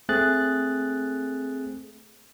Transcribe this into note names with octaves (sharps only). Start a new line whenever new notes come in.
A3 C4 G#4 F#6 A6